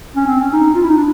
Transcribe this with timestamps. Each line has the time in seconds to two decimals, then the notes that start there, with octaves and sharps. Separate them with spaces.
0.16 C#4
0.27 C4
0.40 C#4
0.52 D#4
0.75 F4
0.82 E4
0.89 D#4
0.97 D4